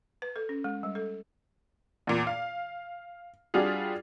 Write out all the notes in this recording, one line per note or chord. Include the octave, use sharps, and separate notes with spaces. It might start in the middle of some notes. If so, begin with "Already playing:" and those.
B4
A4
C#4
G#3
G3
A4
E2 A#2
F5
G3 D4 F4 F#4 G#4